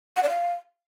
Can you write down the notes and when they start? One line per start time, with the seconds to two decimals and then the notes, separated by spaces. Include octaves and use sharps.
0.17 F#5
0.23 D5
0.29 F5